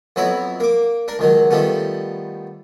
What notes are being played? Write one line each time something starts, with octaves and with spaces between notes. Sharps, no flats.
F2 F#3 B3 E4 C#5 A#5
A#3 D6
D4 A#4
C#2 D#3 F#3
D#3 F3 G3 A3 B3